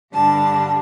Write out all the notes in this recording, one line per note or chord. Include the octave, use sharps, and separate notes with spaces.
G2 D3 G3 D4 A5